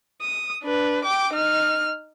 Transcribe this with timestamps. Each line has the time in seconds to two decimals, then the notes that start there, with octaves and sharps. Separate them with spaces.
0.22 D#6
0.63 D4 B4
1.05 G5 D6
1.34 D#4 F6